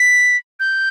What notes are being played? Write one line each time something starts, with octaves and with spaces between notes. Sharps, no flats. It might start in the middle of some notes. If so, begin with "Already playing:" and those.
Already playing: B6
G6